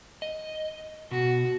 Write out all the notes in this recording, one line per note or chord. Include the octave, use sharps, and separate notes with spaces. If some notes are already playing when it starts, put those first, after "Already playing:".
D#5
B2 F#4